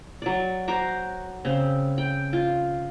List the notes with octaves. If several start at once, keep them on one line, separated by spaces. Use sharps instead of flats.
F#3 D5
F#4 C5 A#5 D6
C#3 C4
G5
F4